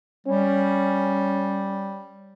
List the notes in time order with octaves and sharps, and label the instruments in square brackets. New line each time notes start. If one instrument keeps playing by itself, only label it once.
[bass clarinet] G3 [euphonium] C#4